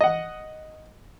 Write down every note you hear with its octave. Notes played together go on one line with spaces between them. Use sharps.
D#5 F#5